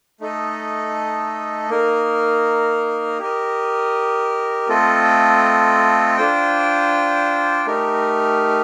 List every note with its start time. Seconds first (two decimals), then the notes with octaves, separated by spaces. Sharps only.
0.20 A3 D#4 A4 D#5
1.69 A#3 D#4 A#4
3.19 G4 A#4 D#5
4.68 A3 C4 F4 A4 D#5
6.17 D4 F4 C5 G5
7.66 A3 D#4 G4 A#4